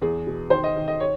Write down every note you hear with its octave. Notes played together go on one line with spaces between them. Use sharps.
E2 G#4
B2
D#3 C5
D#5
D#3
D#5
C#5